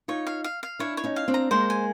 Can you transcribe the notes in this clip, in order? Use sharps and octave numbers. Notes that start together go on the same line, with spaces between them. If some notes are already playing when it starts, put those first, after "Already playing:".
D#4 F4 C#5
F5
F5
F5
D4 E4 C#5
C#5
C#4 D#4
F5
C4 D4
A#5
G#3 A#3 C5
G#5